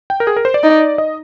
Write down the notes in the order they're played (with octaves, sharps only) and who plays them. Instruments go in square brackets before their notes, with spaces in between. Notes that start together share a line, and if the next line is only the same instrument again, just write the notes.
[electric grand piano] G5
A#4
G#4
A#4
C5
D5
[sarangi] D#4
[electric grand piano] D#5